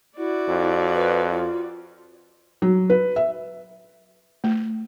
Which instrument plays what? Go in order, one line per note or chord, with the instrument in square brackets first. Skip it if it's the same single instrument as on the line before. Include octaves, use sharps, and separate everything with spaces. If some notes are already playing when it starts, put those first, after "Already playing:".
[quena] E4 [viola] F#4 D5
[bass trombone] F2
[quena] B4
F4
[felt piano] F#3
B4
E5
[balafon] A3